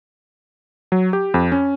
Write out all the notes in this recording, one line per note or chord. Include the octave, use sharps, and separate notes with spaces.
F#3
G4
F2
C#4